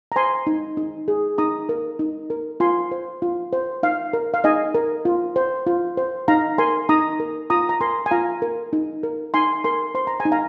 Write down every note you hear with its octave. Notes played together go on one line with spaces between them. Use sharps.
A#5
C5 G#5 C6
D#4
D#4
G#4
D#4 A#5 D#6
A#4
D#4
A#4
F4 G#5 C6
C5
F4
C5
D#4 F5
A#4
F5
D#4 D#5 G#5
A#4
F4
C5
F4
C5
D#4 F5 A#5
A#4 G#5 C6
D#4 A#5 D#6
A#4
F4 A#5 D#6
A#5
A#4 G#5 C6
G#5
F4 F5 A#5
A#4
D#4
A#4
D#4 G#5 C6
A#4 G#5 C6
C5 C6
A#5
G#5
D#4
F5 A#5